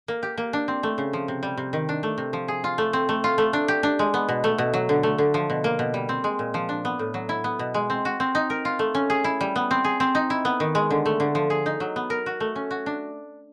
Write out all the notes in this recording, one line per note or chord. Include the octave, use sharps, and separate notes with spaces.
A#3
G4
A#3
D4
C4
A3
C#3
F3
C3
G3
C3
D#3
D4
A3
C3
F3
G#4
F4
A3
C4
A3
F4
A3
D4
G4
D4
G#3
B3
B2
A3
B2
F#3
D3
A3
D3
F3
B2
A#3
B2
G3
C4
G#3
A#2
F3
D4
B3
A2
F#3
E4
B3
B2
G#3
C4
F#4
C4
D#4
A#4
F4
A3
C#4
G#4
E4
G3
B3
C4
G#4
C4
D#4
E4
B3
D#3
G#3
D3
A3
D3
F3
G#4
D#4
F#3
B3
A#4
F#4
A3
C#4
F#4
D4